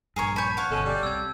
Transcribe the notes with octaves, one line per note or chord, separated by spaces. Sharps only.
A#1 G2 G#4 A#4 C#5
C#5 A5 B5 G6
C#5 F5 F#5
G1 B2 G#3 C#4 A4
G3 D5
C2 C3 E6 G#6